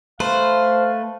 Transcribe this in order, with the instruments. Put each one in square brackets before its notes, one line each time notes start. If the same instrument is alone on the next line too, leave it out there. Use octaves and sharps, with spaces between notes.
[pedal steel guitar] A3 B4 [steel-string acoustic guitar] C5 [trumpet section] F5